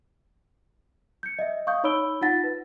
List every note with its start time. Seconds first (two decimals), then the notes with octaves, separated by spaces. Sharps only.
1.23 G6 C#7
1.39 D#5 E5
1.67 F5 C#6 D#6 G6
1.84 D#4 C#5 B5 E6 D7 G7
2.22 D#4 F4 F#5 A6 A#6
2.44 B4